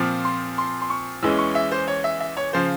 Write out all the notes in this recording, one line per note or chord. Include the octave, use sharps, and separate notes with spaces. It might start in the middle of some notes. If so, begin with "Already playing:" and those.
Already playing: A#2 F3 C4
C6
C6
C6
C#6
E2 E3 G#3 C#4 E6
C#6
E5
C5
C#5
E5
E5
C#5
C#3 F3 C5